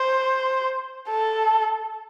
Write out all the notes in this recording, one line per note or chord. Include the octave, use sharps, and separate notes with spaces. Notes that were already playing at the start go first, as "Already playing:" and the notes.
Already playing: C5
A4